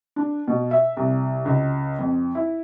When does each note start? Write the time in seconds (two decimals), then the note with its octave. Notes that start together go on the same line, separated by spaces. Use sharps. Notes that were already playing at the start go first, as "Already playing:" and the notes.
0.16 D4
0.48 B2
0.71 E5
0.97 C2
1.45 C#2
1.99 F2
2.35 E4